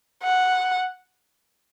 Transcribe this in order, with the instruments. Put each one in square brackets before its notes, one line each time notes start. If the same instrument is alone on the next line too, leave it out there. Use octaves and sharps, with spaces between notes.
[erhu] F#5